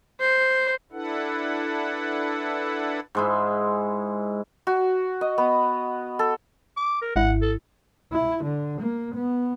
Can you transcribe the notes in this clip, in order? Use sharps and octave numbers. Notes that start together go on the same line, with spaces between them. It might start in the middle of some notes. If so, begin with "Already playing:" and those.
C5
D4 E4 A4 B4 F#5
G#2 G#3 E4
F#4
D#5
B3
A4
D6
A#4
G#1 G#2 E4 F#5
A4
E4
D3
A#3
B3